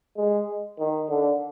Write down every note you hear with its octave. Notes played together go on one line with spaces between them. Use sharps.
G#3
D#3
D3